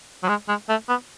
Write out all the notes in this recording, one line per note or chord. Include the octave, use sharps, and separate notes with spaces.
F#3
G#3
G#3
A3
B3